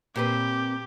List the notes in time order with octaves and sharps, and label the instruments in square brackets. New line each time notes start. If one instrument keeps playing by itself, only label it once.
[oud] A#2 C4 B4 [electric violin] G4